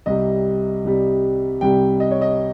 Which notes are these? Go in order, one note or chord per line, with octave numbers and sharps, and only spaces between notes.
C2 C3 G3 D#5
C2 C3 G3
C2 C3 G3 G5
D#5
C#5
D#5